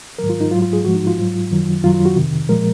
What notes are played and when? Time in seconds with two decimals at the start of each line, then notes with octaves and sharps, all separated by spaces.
0.19 G#2 D#3 F#3 A#4
0.30 F4
0.40 D#4
0.51 G#2 F#3 F4
0.62 F4
0.73 G#4
0.85 G#2 F3 G#3 F#4
0.95 D#4
1.07 F4
1.18 G#2 F#3
1.51 F#2 D#3 F#3
1.83 F#2 D#3 F#3 F4
1.94 F4
2.05 F#4
2.16 F2 C3 D#3
2.49 A#2 F3 G#3 A#4